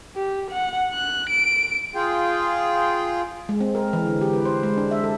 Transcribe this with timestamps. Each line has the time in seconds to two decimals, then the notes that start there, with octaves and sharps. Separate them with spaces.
0.16 G4
0.51 F#5
0.93 F#6
1.30 D7
1.95 F4 G#4 G5
3.49 G#3
3.61 C4
3.75 A#4
3.93 E3
4.07 D3
4.21 G4
4.33 B4
4.45 C5
4.63 G#3
4.77 D4
4.91 E5
5.03 A4